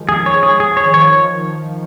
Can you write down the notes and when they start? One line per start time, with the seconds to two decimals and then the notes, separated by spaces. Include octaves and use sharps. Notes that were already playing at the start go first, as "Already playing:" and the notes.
Already playing: D#3 F3 G#3
0.09 G#4
0.26 C#5
0.43 F3 G#4
0.60 G#4
0.77 C#5
0.85 D#3
0.94 F3 C#5